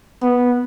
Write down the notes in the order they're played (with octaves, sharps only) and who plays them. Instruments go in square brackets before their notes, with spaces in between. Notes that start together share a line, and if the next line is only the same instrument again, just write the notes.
[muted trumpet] B3